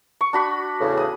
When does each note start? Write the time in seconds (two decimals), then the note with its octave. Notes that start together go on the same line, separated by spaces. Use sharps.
0.21 C#6
0.33 D4 F#4 B5
0.80 E2 A2 C#3
0.97 D#6